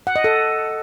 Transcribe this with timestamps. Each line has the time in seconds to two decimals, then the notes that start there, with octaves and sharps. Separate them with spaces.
0.07 F#5
0.16 D#5
0.24 A4